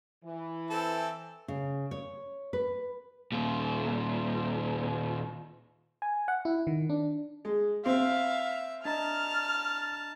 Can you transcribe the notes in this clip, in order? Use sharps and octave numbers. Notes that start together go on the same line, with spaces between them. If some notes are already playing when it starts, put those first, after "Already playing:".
E3
C4 A4
C#3
C#5
B4
D#2 A#2
G#5
F#5
E4
D#3
D4
G#3
C4 E5 F5
D4 D#5 A5 A#5 F6